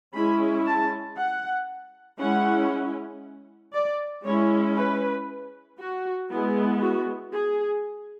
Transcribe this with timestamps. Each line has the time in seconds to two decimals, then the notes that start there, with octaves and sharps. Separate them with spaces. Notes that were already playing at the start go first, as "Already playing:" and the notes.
0.14 G#3 C#4 E4 B5
0.66 A5
1.17 F#5
2.19 G#3 C#4 E4 F#5
3.74 D5
4.25 G#3 C#4 E4 C#5
4.76 B4
5.79 F#4
6.30 G#3 B3 E4
6.82 F#4
7.33 G#4